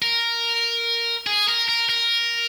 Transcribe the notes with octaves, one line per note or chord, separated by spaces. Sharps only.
A#4
G#4
A#4
A#4
A#4